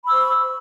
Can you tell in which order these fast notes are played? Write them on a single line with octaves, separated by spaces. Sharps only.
B5 E6 C5 C#6